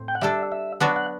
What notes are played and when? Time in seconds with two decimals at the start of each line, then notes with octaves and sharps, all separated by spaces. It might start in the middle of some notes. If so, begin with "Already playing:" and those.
Already playing: A2 C4
0.08 G5
0.15 F#5
0.21 G3 D4 A4 E5
0.52 E5
0.80 F#3 B3 D4 F#4 F#5
0.96 F#5